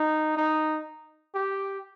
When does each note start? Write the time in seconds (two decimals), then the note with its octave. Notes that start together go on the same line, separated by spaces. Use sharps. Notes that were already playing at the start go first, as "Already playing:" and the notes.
Already playing: D#4
0.37 D#4
1.35 G4